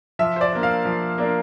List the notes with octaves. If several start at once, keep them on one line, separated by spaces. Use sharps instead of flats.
F3 E5
C5
D5
A#3 D4
F5
F3
A#3 D4